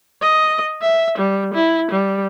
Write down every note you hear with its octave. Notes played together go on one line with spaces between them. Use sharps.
D#5
E5
G3
E4
G3